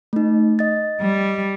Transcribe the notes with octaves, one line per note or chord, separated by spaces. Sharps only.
A3 D#4
D#5 A6
G3